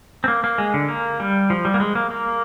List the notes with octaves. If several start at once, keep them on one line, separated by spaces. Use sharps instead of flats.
C4
A#3
A#3
G#3
D3
A#3
G3
F3
G3
A#3
G#3
A#3
A#3